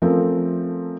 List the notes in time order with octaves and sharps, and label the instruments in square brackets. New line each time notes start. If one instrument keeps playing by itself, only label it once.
[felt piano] F3 A3 C4 C#4 A#4